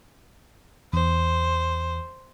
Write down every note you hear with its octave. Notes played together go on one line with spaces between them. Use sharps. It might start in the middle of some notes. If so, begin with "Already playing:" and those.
E2 C5